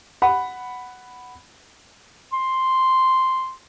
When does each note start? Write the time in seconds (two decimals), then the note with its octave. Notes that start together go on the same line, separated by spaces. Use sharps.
0.22 F#5 B5
2.33 C6